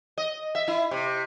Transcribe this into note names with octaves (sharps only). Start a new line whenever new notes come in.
D#5
E5
E4
C3